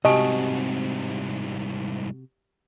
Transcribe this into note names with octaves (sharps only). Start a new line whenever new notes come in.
C2 G#2 C3 F#4 G4 D#5 G#5 A5